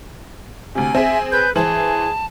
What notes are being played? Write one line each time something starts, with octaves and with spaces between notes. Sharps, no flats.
D2 C3 G#5
C4 G#4 E5
B4 G6
E3 G#4 C5 A5